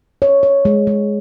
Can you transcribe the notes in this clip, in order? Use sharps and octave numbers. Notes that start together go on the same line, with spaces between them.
C#5
C#5
G#3
G#3